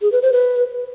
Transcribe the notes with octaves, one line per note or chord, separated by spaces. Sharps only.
G#4
B4
C5
B4